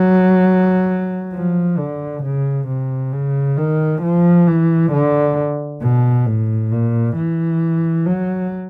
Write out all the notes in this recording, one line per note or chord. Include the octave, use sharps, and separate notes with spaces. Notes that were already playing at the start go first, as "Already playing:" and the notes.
Already playing: F#3
F3
D3
C#3
C3
C#3
D#3
F3
E3
D3
B2
A2
A#2
E3
F#3